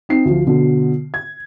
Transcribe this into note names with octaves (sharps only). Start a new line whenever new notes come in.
C4 D#4 C7
D2 F3
B2 D3
G#6